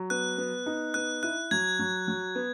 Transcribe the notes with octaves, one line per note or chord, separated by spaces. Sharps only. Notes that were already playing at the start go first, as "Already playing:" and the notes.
Already playing: F#3
B3 F#6
B3
D#4
B3 F#6
E4 F#6
F#3 G#6
F#3
F#3
B3